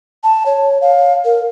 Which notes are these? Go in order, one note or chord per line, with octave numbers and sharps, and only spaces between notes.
A5
C#5
F5
A#4